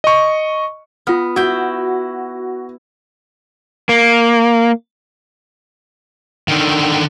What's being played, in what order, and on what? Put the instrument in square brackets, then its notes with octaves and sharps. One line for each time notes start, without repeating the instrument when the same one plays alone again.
[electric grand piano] D#5 C#6
[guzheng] B3 [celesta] F4 F6
[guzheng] E4 G5 [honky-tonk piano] F#4
[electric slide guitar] A#3
[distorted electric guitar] D3 D#3